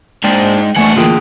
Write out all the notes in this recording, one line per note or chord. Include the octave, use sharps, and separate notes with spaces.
G#2 G#3 D4 C5 G5
A2 E3 A3 D4 F#5 G#5 C#6
D3 E3 A#3 F4 G#4 G5